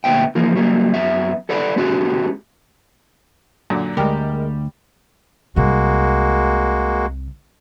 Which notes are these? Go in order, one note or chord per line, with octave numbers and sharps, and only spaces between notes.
D2 A#2 B3 E5 G5
E3 F3 A#3
F#3 G3 A#3
F#2 B3 E5
A4 B4 D5 F#5 B5
G#3 B3 C#4 F#4 G4
F#2 A#2 D3
D2 G3 G#3 G4 A#4
C2 C3 G#3 A#3 F#4